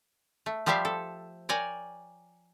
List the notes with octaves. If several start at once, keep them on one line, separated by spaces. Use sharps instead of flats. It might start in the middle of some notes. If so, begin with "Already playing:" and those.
A3
F3 G3 G4 C5 E5 F5
A4
A#4 C#5 D5 G5 G#5